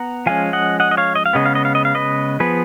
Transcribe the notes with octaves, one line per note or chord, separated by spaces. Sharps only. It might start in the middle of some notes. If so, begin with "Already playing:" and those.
Already playing: B3 F#5 A#5
F3 G#3 C#4 F5 G#5
D#5 F#5
D#5 F#5
D#5
C#5 F5
D#5
F5
C#3 G#3 B3 D#5
F5
D#5
F5
D#5
F5
B4 D#5
F3 B3 G#4 B4